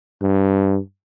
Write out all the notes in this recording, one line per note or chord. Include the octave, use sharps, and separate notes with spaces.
G2